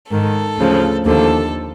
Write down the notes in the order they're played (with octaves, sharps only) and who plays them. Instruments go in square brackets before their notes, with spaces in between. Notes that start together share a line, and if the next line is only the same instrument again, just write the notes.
[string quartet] G#2 D#3 A4
D2 C#3 F3
D#2 D3 F3 A4